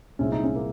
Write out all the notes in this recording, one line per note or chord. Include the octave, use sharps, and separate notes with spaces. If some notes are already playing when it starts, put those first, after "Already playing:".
C2 A#2 G#3 C4 C#4 F4
D#4
C#4
A#3